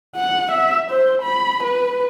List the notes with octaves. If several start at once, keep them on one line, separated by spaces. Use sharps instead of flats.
F#5
E5
C5
B5
B4